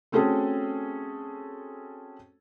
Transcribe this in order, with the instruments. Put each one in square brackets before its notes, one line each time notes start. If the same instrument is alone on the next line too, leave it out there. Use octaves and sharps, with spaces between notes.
[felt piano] A3 C4 C#4 F#4 G#4 A4